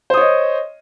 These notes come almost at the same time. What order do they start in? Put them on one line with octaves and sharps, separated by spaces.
C5 D#6 C#5 D#5